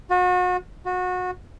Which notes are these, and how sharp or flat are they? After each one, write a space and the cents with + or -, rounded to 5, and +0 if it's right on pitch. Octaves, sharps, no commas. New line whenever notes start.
F#4 -35
F#4 -25